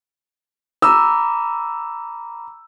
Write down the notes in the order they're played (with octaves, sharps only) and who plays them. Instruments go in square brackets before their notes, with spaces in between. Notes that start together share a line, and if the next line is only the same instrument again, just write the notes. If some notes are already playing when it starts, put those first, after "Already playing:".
[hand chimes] A#5 B5 D6 [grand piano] E6